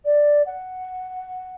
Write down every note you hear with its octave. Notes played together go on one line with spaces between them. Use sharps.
D5
F#5